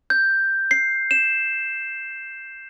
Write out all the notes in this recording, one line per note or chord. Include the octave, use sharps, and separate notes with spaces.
G6
C7
E7